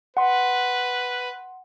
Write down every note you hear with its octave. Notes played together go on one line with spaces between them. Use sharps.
B4 F#5 C6